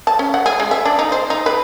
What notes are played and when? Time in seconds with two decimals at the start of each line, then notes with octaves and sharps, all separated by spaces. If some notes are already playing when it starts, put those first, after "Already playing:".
0.07 A5
0.19 C#4
0.34 F#5
0.46 G#4
0.60 G#3
0.71 E5
0.85 D4
0.99 D#4
1.12 C5
1.30 D#4
1.46 B4